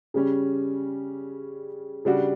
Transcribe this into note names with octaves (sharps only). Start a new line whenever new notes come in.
C#3 G3 C#4
C#3 G3 D4 F#4